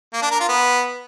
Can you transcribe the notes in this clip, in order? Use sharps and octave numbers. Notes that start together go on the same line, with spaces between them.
A#3
D4
A#4
F4
B3